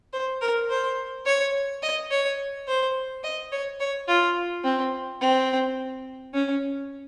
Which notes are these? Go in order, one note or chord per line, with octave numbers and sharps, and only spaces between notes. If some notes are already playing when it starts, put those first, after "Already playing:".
C5
A#4
C5
C#5
D#5
C#5
C5
D#5
C#5
C#5
F4
C4
C4
C#4